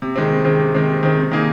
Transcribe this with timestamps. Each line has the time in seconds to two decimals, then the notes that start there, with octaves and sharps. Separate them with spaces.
0.02 C3
0.15 D#3 G#3 C4
0.30 C3
0.45 D#3 G#3 C4
0.59 C3
0.75 D#3 G#3 C4
0.89 C3
1.03 D#3 G#3 C4
1.17 C3
1.31 D#3 A#3 D#4 G#4